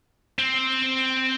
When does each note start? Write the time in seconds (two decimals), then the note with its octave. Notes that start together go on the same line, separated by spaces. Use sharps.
0.39 C4